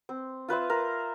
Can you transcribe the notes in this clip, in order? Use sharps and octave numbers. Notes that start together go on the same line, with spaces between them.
C4
F4 B4 C5 E5
A#4 C5